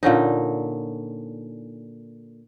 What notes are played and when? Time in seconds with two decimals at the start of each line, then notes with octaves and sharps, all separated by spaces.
0.03 A#2 D3 C#4 D#4